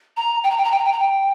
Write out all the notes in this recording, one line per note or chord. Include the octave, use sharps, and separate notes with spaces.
A#5
G5
A#5
G5
A#5
G5
A#5
G5
A#5
G5